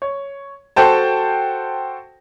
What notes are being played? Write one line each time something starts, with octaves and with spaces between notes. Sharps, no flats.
C#5
F#4 A4 C5 G5 A5